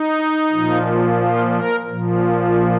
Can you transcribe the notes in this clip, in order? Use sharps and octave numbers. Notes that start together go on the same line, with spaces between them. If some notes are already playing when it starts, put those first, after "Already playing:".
Already playing: D#4
A#2 F3
F4
A#4
A#2 F3